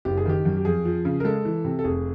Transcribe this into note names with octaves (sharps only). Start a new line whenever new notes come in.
F#1 G4
G#4
D#3 G4
F#2
G4
F2 G#4
F3
C#3
A#4
G#3 A4
E3
C3
A4
F1 G#4